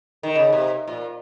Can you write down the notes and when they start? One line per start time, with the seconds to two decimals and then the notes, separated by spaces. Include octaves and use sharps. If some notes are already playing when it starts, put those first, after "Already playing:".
0.23 D#3
0.35 C#3
0.53 C3
0.88 A#2